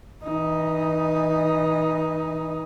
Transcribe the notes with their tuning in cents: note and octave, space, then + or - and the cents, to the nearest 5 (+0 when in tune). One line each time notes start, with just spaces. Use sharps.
E3 -30 D#4 +0